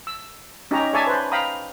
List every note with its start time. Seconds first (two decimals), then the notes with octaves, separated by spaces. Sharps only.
0.07 E6
0.71 C#4 D#4 G4 C#5 D#5 A#5
0.93 G#4 C#5 D5 E5 G#5 A5
1.07 B4 C5
1.32 F5 G5 A#5 B5 D#6